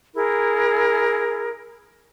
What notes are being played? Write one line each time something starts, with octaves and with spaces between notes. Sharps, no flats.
E4 G#4 A#4